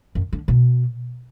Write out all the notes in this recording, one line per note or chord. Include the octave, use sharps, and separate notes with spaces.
F#2
D3
B2